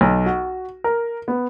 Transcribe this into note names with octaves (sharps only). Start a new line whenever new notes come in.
B1
F#4
A#4
B3